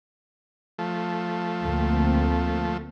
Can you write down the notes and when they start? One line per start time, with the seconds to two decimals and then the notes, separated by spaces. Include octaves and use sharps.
0.79 F3 A3
1.64 D2 A#3 C4